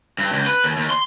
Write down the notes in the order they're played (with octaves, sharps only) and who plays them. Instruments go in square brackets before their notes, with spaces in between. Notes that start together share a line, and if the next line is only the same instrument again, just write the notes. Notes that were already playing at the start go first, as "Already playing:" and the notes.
[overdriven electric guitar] G2
C#2
B4
D#2
D#2
C6